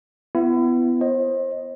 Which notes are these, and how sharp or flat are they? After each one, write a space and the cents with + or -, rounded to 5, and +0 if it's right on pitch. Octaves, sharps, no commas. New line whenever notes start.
B3 +20 E4 +35
C5 +35 D#5 +0